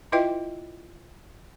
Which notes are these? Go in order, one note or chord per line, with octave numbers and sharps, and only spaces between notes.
E4 F4 B4 D#5 E5 G5